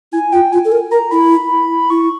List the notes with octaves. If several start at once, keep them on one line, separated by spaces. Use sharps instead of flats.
E4 G#5
F4 G5
F4 G#5
A4
A#4
A#4 A#5
E4 B5
E4 C#6